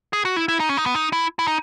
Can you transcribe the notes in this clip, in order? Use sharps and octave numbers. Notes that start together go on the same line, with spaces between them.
G#4
F#4
E4
E4
D#4
C#4
D#4
B3
D#4
E4
E4
D#4